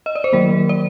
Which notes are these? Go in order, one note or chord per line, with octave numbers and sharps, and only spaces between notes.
D#5
D5
C5
D#3 F#3 A#3 A#4
D5